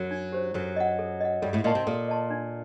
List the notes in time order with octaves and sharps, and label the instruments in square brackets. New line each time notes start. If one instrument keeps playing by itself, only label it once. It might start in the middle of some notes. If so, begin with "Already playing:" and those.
Already playing: [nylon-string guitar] F#2 F#3
[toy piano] D4
G4 C5
[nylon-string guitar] F#2 F#3 [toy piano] A4
[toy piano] D#5 F#5
A4
D#5 F#5
[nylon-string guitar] G2 G3 [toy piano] A4
[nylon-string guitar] A2 A3
[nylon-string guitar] A#2 A#3 [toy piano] D#5 A5 C6
[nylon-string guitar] C3 C4
[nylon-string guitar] A#2 A#3 [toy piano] A4
[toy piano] D#5 A5 C6
D4